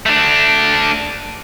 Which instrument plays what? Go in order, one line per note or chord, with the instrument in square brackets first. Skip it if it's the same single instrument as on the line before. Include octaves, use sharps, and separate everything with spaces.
[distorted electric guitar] A3 D4